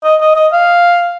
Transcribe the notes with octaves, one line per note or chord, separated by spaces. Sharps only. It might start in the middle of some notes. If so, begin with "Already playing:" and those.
D#5
D#5
D#5
F5